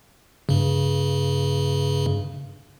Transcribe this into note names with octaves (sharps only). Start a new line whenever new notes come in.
G2 C#3